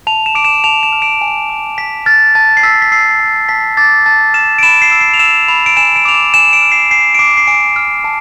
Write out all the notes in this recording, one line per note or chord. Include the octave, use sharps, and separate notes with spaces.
A5 F7
E7
D6 D7
E7
A5 F7
E7
F6
D7
G#5
D6
G#5 B6
F6 A6
A5 A6
C7
E6 B6
B6
E6 C7
A5
A5 B6
D6 A6
A5 A6
F6 E7
D7
B5 E7
C7
E6
C7
F7
E6 E7
B5 F7
D7
G#5 E7
D7
D6 F7
E7
G#5 E7
D7
F6
C7
G#5 C7
D7
D6 C7
C7
G#5 D7
F6
A5